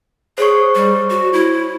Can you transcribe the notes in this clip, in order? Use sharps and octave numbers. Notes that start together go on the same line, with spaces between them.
G#4 C5 C#5 C#6
G3
F#4
E4